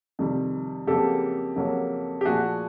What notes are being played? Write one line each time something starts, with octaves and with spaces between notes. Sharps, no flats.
F2 C3 D#3 G3
F2 C#3 F#3 A#3 G4 A4
F2 C#3 F#3 A#3
G4
A#2 F3 A3 F#4 G#4